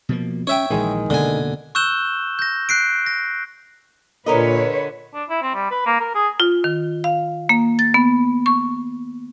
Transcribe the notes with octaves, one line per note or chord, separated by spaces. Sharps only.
B2 F3 A#3
C#4 C#5 E5 G5
A#1 D#3 E3 G#3
F1 B2 D3 A#3 G#5
C#6 E6 F#6 G6 E7 G7
G6 A#6
F#6 C7 D7
A#6
A#2 D3 A#4 B4 C#5 D#5
D4
E4
C4
G3
B4
A#3
A#4
G#4
F4
D#3
F5
A#3
A6
B3
C#6